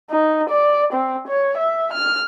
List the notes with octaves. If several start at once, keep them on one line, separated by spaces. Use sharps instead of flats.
D#4
D5
C4
C#5
E5
F6